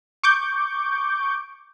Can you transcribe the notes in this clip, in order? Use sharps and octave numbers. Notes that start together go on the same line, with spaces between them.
C#6 D6 G6